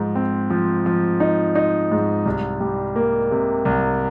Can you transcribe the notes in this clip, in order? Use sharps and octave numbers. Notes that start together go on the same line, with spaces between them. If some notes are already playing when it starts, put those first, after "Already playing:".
Already playing: G#2 F3
C4
F3
F3
D#4
D#4
G#2
C2
G3
A#3
C3
C2